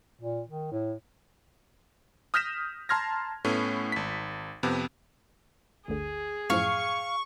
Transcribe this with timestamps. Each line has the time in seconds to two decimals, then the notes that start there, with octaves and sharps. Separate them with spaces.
0.21 A#2
0.49 D#3
0.72 A2
2.34 D#6 F6 G6 A#6 B6 E7
2.89 A5 A#5 C6 F6 G#6 A#6
3.45 A2 A3 B3 C#4
3.92 G#1 B6
4.63 F2 C3 B3
5.88 G1 D2 D3 G#4
6.50 F#2 A2 F3 F5 C#6